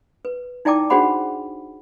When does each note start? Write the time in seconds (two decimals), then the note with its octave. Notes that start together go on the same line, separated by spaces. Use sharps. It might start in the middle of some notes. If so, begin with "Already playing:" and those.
0.25 B4
0.65 D#4 E4 D5 G5 A5 D6
0.90 D4 F#4 G#4 C5 F#5 B5